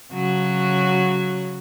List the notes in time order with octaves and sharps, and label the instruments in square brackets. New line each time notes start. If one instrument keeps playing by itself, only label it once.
[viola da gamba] C#3 F#3 F#4